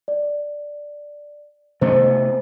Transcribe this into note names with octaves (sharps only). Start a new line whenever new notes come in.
D5
C3 A3 B3 C5 D#5